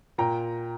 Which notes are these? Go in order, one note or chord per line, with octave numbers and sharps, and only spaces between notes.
A#2 G5 A#5